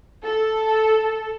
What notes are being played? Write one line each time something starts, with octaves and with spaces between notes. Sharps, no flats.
A4